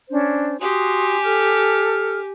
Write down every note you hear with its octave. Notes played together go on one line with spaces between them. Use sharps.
C#4 D4 C5
F#4 G4 G#5 C6 D#6
A4 F6